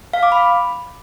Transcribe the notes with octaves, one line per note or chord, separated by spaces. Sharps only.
F5
D6
B5